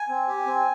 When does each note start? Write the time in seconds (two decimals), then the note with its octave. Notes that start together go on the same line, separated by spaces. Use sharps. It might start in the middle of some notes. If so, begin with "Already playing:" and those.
Already playing: G#5
0.09 C4
0.28 G4
0.46 C4